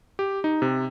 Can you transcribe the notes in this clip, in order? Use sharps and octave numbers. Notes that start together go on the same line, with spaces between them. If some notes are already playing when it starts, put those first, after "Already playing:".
G4
D#4
C3